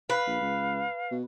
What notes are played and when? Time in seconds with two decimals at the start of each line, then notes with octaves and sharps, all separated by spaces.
0.10 B4 F5
0.27 A#1
0.41 C#2
1.11 B2